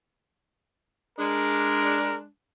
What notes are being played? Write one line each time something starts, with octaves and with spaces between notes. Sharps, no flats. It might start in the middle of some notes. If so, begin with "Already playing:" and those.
G#3 D4 A#4